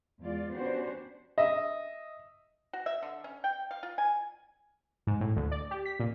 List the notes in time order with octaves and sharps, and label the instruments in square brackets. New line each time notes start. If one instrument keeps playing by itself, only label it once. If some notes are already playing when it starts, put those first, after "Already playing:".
[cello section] E2 G#3 F4 D5
B3 C#4 D4 F#4 G4 C5
[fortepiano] D#5 E5
[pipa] F#4
E5
D3
C#4
G5
F5
F4
G#5
[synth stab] G#2
A2
D2
D5
G4
B6
A#2